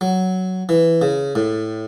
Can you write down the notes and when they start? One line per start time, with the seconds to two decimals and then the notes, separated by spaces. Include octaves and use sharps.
0.01 F#3
0.69 E3
1.02 C#3
1.35 A2